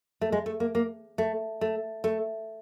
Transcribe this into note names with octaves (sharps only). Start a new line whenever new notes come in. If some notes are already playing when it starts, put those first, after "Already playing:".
A3
G#3
A3
A#3
A#3
A3
A3
A3